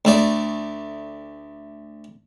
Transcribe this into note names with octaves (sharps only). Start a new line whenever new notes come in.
D2 A3 D5